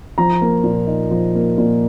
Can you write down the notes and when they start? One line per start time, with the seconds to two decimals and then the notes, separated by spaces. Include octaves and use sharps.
0.18 F3 A#5
0.41 A#3
0.64 A#2
0.87 D#4
1.11 F3
1.35 A#3
1.58 A#2